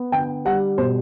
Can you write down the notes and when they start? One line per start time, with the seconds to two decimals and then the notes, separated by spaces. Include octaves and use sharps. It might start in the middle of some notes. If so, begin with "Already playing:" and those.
Already playing: B3
0.12 D3 G5
0.45 G3 F#5
0.78 B2 C5